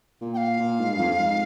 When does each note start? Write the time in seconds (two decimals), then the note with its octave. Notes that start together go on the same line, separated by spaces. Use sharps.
0.21 A#2
0.34 G5
0.37 F5
0.60 A#2
0.80 G#2
0.93 G2
0.99 F2
1.20 G#2